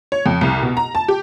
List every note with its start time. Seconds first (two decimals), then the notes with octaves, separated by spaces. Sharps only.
0.12 C#5
0.26 F2
0.41 C2
0.62 B2
0.77 A#5
0.95 A5
1.08 G4